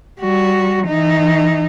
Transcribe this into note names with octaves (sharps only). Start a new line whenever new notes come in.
G3 F#4
E3 D#4